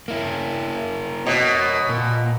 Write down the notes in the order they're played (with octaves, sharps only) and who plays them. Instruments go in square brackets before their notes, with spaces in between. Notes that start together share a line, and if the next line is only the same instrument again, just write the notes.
[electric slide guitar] A#3 E4
[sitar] B2 [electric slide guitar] A#4 C#5
[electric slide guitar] A#2